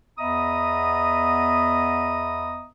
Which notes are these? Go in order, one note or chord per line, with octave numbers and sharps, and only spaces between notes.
E2 B3 D#5 E5 A#5 D#6